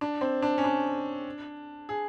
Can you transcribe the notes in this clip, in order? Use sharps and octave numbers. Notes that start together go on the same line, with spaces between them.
D4
C4
D4
C#4
D4
G#4